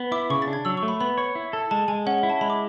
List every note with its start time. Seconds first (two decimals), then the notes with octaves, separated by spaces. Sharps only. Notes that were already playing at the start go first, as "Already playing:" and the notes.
Already playing: B3
0.12 E4 D6
0.30 C#3 C#6
0.42 A6
0.48 D4
0.53 G#6
0.65 F#3 E6
0.77 C#6
0.83 A3
0.88 B5
1.01 B3 B5
1.18 C#5 B5
1.35 E4
1.53 A4
1.71 G#3 A5
1.88 G#3 G#5
2.07 C#4 F#5
2.18 F#5
2.23 E4
2.30 A5
2.41 G#3 B5
2.50 D6